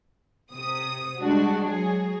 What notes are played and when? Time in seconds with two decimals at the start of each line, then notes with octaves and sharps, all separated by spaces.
0.49 C3 D#6
1.18 G3 G#3 D4 F#4
1.65 F#3 G#4